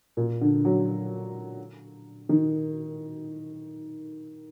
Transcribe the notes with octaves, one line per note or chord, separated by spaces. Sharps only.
A#2
D3
F#3
D#3